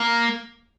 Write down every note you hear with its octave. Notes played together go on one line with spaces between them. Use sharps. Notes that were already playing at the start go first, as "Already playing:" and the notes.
Already playing: A#3